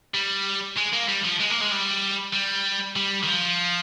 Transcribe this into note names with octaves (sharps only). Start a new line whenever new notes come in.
G3
G#3
A#3
G3
F3
G#3
A#3
G#3
G3
G3
G3
D#3
F3